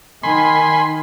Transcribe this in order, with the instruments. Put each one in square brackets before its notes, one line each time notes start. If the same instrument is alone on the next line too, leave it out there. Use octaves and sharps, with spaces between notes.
[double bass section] D#3 [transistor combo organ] G#5 B5 C6